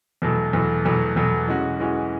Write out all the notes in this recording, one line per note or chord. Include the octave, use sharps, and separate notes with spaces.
E2 B2 F#3 A3
E2 B2 F#3 A3
E2 B2 F#3 A3
E2 B2 F#3 A3
E3 G#3 C#4 F#4
E3 G#3 C#4 F#4